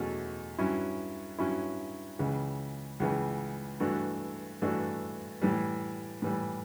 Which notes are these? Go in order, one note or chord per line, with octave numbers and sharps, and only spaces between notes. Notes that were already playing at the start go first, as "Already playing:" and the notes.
Already playing: E2 B2 F#3 A3 C#4
G2 F#3 C#4 E4
G2 F#3 C#4 E4
C#2 C#3 E3
C#2 C#3 E3
G2 E3 A3 D4 F#4
G2 E3 A3 D4 F#4
A2 E3 G3
A2 E3 G3